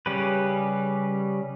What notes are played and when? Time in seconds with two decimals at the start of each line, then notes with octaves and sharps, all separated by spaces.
0.06 C#3 G3 C#4 G4 B4